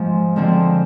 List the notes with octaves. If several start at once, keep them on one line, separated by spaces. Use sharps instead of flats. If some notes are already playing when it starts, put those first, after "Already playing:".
Already playing: G#2 F3 G#3
F2 D3 F3 G#3 C4